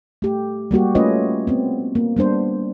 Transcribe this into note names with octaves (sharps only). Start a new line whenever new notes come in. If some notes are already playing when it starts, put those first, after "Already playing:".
A3 G4
G3 A#3 F#4 G4
A3 C#4 F4 B4 C#5 D#5
B3 C4
A#3
G3 B3 D4 C5